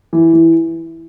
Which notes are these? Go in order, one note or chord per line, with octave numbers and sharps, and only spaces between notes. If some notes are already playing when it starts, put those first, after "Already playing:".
E3
E3